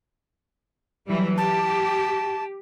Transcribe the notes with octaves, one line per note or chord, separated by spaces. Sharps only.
E3 F#3 G3
G4 A5